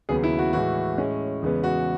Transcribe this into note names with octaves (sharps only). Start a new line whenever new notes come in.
D#2 C#3 F#3 B3 G#4
E4
F#4
A2 E3 G#3 F#4
A2 G#3 C#4
E2 C#3 G#3 B3
F#4